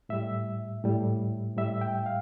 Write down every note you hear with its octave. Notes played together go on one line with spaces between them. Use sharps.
A2 G3 E5
A2 G3
A2 G3 E5
G5
F5